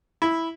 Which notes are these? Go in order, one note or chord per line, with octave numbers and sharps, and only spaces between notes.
E4